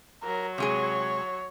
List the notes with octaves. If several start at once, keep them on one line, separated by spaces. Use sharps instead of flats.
F#3 A#4
C3 G#3 G#4 C#5